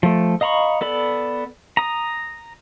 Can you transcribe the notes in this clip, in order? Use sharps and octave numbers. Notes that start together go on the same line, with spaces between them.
F3 A3
D#5 F5 A#5 B5 C#6
B3 A4 D5 B5
A#5 D#6